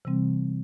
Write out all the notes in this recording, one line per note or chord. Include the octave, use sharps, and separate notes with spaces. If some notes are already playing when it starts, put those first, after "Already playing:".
C3 E3 G3 C4